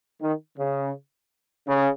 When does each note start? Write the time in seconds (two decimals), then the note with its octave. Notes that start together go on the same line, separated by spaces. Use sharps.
0.21 D#3
0.58 C#3
1.67 C#3